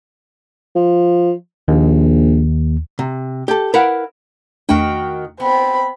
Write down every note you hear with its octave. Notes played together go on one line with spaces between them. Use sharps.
F3
A#1 D#2
C3
G4 A4
E4 A#4 B4 F5 F#5
E2 D#3 A3 D4 F#4 G5
B3 C4 B5